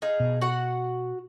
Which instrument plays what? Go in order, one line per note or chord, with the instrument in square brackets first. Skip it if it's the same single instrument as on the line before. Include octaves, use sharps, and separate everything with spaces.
[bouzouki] D#4 G#4 F5
[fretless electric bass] B2
[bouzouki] F#4 F#5